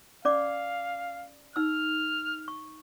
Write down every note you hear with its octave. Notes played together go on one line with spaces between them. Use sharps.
C#4 D5 F5 D6
D#4 E6 F6
C#6